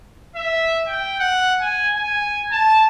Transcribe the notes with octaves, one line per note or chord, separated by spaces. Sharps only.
E5
G5
F#5
G#5
G#5
A5